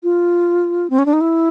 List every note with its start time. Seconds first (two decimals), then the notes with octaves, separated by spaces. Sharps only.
0.03 F4
0.90 C4
0.99 C#4
1.06 D4
1.13 D#4
1.21 E4